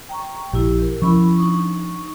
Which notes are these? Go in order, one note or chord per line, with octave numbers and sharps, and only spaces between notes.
G5 A#5 C#6
A#1 E4 G4
A#4
F3 C#4 E4 B5 C#6
D4 D#4 C#6